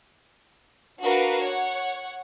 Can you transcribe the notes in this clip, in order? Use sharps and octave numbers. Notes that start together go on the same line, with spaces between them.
D4 F#4 A#4 B4 F5
C#5 F#5